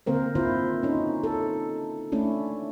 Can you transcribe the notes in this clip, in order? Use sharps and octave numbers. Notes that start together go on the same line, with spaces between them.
D3 A#3 C4 A#4 C5
D#3 E4 F4 C5
C#4 D#4
A4
A3 C#4 D4 E4